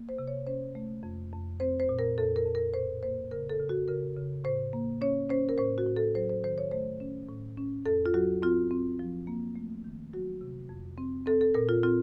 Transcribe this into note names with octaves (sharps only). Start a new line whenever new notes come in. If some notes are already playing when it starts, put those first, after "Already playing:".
Already playing: A#3
C5
C3
C#5
C#4 C5
A3
F2
F2
C4 C5
C5
A#2
A#4
F2 A4
A#4
F2
A#4
A2 C5
A#3 C5
C#3 A#4
A4
C#3
F#4
C#3 A#4
C#3
A2 C5
A#3
C#4 C#5
C#4 C5
A#4
A2 C5
F#4
A2
A4
F#3 C5
C5
D#3 C5
C#5
A3 C5
C#4
A2
C#4
F2 A4
F4
F#3 F#4
C4 F4
C4
F3
A#3
A3
D#3
F#3 F#4
C3
F2
C4
C4 A4
A4
A#2 A#4
F4
C4 F4